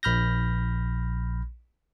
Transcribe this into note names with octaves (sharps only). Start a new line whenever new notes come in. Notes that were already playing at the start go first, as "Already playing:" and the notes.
A#1 B5 F6 G6 A#6